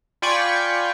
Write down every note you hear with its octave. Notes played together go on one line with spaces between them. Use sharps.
F4 D5 G5 G#5 B5 C#6